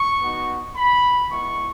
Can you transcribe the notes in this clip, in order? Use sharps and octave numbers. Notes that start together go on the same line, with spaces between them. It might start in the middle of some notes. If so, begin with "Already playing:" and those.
Already playing: C#6
B3 D#4 F#4
B5
G#3 B3 E4 C#6